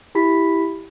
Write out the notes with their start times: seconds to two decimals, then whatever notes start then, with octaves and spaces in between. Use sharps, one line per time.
0.15 E4 G4 B5 B6